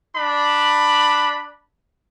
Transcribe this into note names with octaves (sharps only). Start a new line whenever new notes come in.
D4 B5